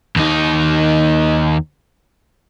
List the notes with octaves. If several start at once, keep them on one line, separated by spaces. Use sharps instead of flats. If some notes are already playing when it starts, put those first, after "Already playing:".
D#2 D#4